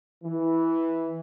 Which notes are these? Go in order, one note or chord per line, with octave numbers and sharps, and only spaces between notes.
E3